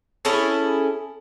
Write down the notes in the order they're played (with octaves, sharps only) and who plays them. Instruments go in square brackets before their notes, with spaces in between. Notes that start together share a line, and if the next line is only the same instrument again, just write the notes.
[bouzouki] C#4 E4 G#4 A4